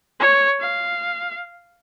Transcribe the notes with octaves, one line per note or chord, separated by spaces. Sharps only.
C#5
F5